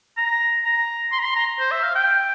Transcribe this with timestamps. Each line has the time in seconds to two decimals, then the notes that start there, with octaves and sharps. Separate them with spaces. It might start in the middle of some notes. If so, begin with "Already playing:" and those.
0.17 A#5
0.64 A#5
1.12 C6
1.19 A#5
1.24 C6
1.36 A#5
1.60 C5
1.71 E5
1.83 F5
1.95 G5